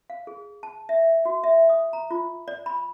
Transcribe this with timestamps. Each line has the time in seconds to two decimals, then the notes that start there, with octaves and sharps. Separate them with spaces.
0.10 F5
0.27 G#4
0.63 A5
0.89 E5
1.25 F#4
1.44 E5
1.69 D#6
1.93 A#5
2.11 F4
2.48 D5
2.66 B5